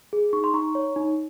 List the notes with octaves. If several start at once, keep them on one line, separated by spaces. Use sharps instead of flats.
G#4
D#4 C#6
C6
D#4 A#5 C#6
C#5
D#4